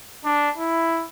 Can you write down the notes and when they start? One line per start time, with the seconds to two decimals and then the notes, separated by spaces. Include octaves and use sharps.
0.25 D4
0.57 E4